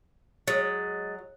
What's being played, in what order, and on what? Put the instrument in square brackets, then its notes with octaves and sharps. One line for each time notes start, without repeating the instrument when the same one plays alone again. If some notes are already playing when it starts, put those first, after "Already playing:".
[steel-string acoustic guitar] F#3 [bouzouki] G#3 [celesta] D#6 A6